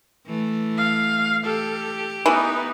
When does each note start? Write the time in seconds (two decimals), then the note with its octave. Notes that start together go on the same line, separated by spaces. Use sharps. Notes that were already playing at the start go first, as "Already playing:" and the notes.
0.27 E3 A3
0.77 F5
1.45 G4 A4
2.26 E3 B3 D#4